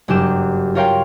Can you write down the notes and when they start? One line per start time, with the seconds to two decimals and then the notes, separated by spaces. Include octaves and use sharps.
0.08 F#1 G2 F#3 G4 E7
0.75 F4 A#4 C#5 F5 G5